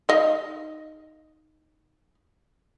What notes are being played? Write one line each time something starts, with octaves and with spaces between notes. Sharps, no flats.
D#4 D#5 F5